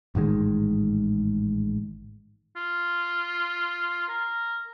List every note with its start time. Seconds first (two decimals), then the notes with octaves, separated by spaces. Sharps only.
0.15 A1 G#2 D#3 G#3
2.56 F4
4.09 A#4